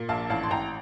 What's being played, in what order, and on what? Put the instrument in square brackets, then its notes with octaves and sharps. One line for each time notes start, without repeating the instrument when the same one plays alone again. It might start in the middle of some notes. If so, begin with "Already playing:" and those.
Already playing: [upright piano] A#2
A#1 F5 A5
A1 F5 A5
C6
A1 G5 A#5